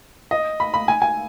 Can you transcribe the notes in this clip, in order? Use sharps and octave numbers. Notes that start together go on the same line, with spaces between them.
D#5
B5
B5
G#5
G#5